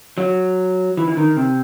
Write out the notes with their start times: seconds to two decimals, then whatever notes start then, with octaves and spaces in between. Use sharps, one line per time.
0.18 F#3
0.97 E3
1.08 E3
1.17 D#3
1.37 C3